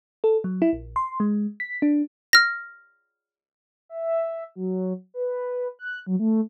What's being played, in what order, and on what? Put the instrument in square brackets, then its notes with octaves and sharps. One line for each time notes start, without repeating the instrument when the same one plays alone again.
[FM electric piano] A4
F#3
E4
A#1
C6
G#3
B6
D4
[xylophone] F6 A#6
[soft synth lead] E5
F#3
B4
F#6
F#3
A3